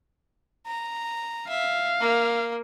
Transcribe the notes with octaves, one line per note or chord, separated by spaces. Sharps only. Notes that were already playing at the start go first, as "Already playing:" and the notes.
A#5
E5 F5
A#3